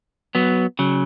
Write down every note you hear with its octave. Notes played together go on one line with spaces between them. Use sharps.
F#3 B3
C#3 F#3